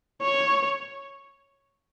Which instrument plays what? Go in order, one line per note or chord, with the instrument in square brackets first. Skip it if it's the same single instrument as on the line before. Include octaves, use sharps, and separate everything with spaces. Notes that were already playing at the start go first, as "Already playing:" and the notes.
[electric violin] C#5